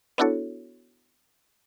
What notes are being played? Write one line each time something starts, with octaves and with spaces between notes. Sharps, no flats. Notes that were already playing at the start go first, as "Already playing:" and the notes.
B3 D4 E4 F#4 A4 C#5